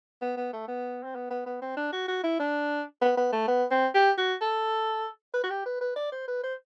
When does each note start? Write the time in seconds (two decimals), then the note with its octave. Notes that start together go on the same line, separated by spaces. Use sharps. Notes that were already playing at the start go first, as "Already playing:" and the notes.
0.22 B3
0.37 B3
0.53 A3
0.68 B3
1.04 C4
1.15 B3
1.30 B3
1.46 B3
1.62 C4
1.77 D4
1.92 F#4
2.08 F#4
2.24 E4
2.39 D4
3.01 B3
3.17 B3
3.32 A3
3.48 B3
3.71 C4
3.95 G4
4.18 F#4
4.41 A4
5.34 B4
5.43 F#4
5.50 G4
5.66 B4
5.81 B4
5.96 D5
6.12 C5
6.28 B4
6.43 C5